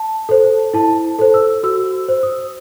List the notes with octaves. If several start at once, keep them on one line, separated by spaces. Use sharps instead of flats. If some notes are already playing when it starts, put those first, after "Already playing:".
Already playing: A5
A4 C5
E4 A5
A4 C5
E6
F#4 E6
C5
D#6